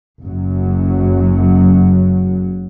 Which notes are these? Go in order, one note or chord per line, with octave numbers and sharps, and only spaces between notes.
F#1 F#2 F#3